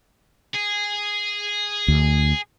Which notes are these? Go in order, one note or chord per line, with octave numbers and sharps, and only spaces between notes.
G#4
D2